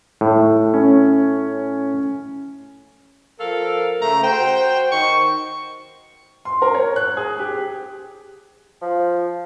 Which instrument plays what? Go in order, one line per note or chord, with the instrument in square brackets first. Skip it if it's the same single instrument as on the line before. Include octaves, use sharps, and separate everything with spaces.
[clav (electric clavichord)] A2
[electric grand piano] C#4
[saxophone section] F3 A4 A#4 [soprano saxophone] F5
[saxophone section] C#3 A3 [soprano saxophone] A#5
[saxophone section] F#4 C5 [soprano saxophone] G5
[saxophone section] D#3 [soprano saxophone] C#6
[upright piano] C6
A#4
C#5
F#6
G#4
G4
[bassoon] F3